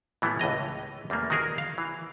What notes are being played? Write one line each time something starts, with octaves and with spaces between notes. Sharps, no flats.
A2 E3 G3 A3 B3
C#2 A2 D#5 A#5
E2 G3 A3 A#3
D#3 D#4 F#4 G#4 A#4
F5
E3